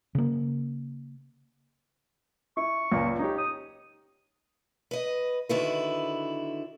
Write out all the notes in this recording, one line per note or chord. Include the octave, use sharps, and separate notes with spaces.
C#3 A#3
E4 C#6
C#2 A#2 C#3
D#4 G4 C#5
D#6
B4 D#5
D3 D#3 E4 F#4 B4